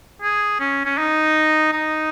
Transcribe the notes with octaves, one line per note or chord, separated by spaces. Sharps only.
G#4
C#4
C#4
D#4
D#4